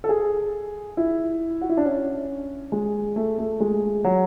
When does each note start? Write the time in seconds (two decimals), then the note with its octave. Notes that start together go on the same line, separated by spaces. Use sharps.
0.04 A4
0.09 G#4
0.97 E4
1.61 F#4
1.69 E4
1.77 D4
1.85 C#4
2.72 G#3
3.16 A3
3.38 A3
3.60 G#3
4.04 F#3